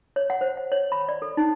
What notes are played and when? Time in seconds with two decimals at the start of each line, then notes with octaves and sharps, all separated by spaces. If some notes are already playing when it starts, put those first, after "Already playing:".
0.16 C#5
0.30 F#5
0.41 C5
0.57 F#5
0.72 C#5
0.92 B5
1.09 D5
1.22 A4
1.37 D#4